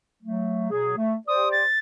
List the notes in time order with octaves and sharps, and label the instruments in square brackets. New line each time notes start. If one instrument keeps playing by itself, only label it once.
[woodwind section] F#3 A3
B2 F#3 G#4
A3
[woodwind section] G4 C5 D5 [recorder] D#6
[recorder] A6